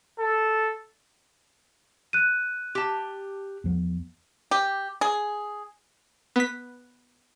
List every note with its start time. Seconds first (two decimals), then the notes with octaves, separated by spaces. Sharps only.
0.19 A4
2.13 F#6 D#7
2.75 G4 A5
3.64 E2 F3 B3
4.51 G4
5.01 G#4
6.36 B3 B6